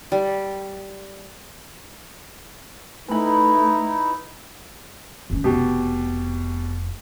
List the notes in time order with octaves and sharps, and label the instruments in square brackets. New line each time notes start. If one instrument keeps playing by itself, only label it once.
[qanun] G3
[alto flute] A3 [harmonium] D#4 E4 [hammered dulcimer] B4 B5
[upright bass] D#3 C#4
[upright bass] F1 [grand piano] B2 G4